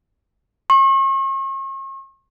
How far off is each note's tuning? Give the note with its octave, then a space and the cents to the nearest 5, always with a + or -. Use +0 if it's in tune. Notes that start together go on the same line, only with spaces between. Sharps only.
C#6 -40